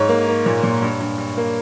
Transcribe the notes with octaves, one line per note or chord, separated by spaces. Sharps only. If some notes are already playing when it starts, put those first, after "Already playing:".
Already playing: G#2 C#5
A#3
A#3
A#2
A#2
G2
G2
G2
A#3